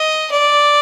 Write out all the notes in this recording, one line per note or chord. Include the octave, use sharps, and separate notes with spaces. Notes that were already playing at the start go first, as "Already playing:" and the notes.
Already playing: D#5
D5